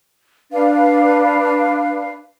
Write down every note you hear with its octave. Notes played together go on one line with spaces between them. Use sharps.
D4 B4 F5